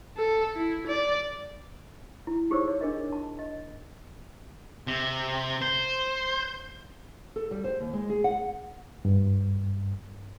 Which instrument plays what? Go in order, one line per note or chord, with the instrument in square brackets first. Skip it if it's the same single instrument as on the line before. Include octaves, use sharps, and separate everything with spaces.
[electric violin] A4
E4
D5
[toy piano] E4
D#4 G4 G#4 C5 C#5 E6
C#5
D4 G#4 A#4 D#5
A5
D#5
[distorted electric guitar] C3
C5
[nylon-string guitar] A4
G3
C5
D#2
G#3
G#4
F#5
[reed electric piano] G2